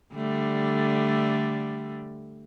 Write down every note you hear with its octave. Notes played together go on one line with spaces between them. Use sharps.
D3 G3 A3